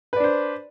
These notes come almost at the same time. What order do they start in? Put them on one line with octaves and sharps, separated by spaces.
B4 D5 D4 C5